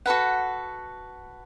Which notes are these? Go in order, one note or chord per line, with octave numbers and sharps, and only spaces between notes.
F#4 A4 B4 F#5